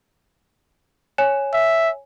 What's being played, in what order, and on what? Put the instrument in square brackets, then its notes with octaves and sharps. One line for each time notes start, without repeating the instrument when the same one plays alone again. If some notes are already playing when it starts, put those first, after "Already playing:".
[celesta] C#5 G#5 E7
[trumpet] E5